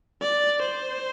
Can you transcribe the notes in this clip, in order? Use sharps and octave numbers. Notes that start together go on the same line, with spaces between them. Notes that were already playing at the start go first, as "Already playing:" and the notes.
D5
C5